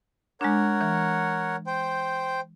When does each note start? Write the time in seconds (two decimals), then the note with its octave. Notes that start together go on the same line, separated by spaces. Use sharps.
0.41 G#3 D4 A#4 C#5 F#5
0.81 E3
1.67 C5 G5